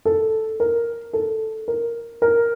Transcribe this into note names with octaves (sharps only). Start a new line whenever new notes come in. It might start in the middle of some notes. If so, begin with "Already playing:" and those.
A4
A#4
A4
A#4
A#4